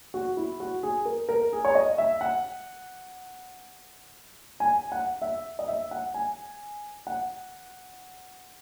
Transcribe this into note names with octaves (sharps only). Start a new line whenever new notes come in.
F#4
E4
F#4
G#4
A#4
A#4
G#4
C#5
D#5
E5
F#5
G#5
F#5
E5
D#5
E5
F#5
G#5
F#5